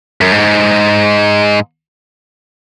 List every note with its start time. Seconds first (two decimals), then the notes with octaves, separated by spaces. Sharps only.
0.21 F#2
0.32 G#2